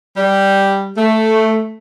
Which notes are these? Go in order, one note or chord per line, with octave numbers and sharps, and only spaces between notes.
G3
A3